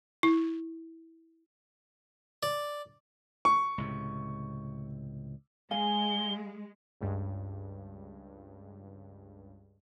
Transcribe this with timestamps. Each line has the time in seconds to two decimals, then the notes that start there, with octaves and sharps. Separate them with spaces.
0.23 E4
2.43 D5
3.45 C#6
3.78 C#2 A2 C3
5.71 G#3 F5 G#5 G7
7.01 C#2 G2